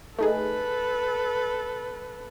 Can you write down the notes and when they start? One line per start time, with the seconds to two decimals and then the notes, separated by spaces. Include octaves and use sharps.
0.19 A3 D#4 G#4 A4 B4